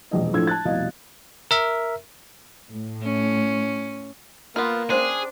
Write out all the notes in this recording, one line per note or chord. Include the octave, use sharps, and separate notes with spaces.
E1 A#1 D#5
A2 F3 A3 D4 E6 G#6
A5 F#6 A6
F1 C2 B2 D#5 F5
A#4 E5
A2
C#4
A#3 B3 F4 C6
C#4 D4 G#4 C5 C6